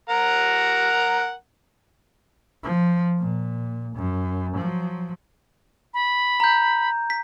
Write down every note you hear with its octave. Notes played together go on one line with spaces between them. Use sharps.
A#4 F#5 A#5
F3
A#2
F#2
F3 F#3
B5
A#5 G6
B6